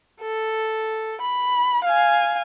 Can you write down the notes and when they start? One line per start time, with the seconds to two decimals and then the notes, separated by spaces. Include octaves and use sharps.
0.21 A4
1.21 B5
1.84 F5 G#5